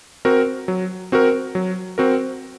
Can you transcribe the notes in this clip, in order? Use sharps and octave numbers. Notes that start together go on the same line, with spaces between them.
C4 F#4 A#4
F#3
C4 F#4 A#4
F#3
C4 F#4 A#4